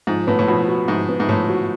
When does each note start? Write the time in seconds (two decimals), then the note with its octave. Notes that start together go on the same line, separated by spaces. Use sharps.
0.07 G#2 F3
0.27 A2 B3
0.39 A2
0.48 B2 F3
0.68 F#4
0.88 G#2 F3
1.09 B3
1.20 G#2
1.29 A2 F3
1.49 F#4